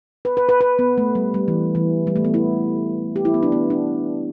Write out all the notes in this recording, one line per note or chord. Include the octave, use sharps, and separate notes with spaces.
B4
B4
B4
B4
B3
A3
G3
G3
E3
E3
G3
A3
B3
E4
G4
E4
B3
D4
B3
D4